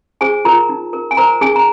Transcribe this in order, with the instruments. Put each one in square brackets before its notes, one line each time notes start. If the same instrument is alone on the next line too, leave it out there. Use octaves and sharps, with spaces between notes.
[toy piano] G#4 C5 G#5
F4 A#4 A#5
D#4
A#4
G#5
A#4 C5 A#5
D#4 G#4 G#5
A#5